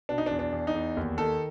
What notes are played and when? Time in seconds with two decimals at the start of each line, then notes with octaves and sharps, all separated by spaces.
0.09 B2 D4
0.18 D#4
0.26 D4
0.31 E2
0.39 D4
0.52 E2
0.67 D#4
0.75 E2
0.97 D#2
1.17 D#3 A4